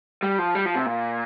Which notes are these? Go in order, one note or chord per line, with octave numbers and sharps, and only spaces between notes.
G3
F3
G3
F3
C3
A#2